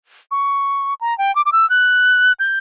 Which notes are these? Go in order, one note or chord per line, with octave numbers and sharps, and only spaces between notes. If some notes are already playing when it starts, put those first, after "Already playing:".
C#6
A#5
G5
D6
D6
E6
F#6
G6